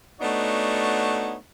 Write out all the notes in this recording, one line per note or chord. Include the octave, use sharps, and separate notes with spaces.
A3 B3 D4 D#4 F#4 C#5